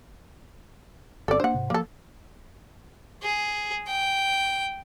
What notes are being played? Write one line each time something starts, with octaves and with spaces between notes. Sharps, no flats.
G1 C4 A4 D5
A#3 D4 C5 F#5
G#2 C3
F3 A#3 A4
G#4
G5